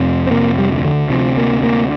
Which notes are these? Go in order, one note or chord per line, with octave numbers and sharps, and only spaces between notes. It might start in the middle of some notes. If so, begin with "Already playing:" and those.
Already playing: F2 C3
C4
C3 A#3
G3
D2
D3
C3 F3
A#3
D2
A#3